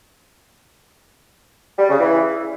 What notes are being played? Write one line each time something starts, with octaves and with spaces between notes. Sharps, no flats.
G3
C#3
E3